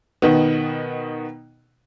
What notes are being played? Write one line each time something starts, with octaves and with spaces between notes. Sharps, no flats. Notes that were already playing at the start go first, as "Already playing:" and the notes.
B2 D#3 B3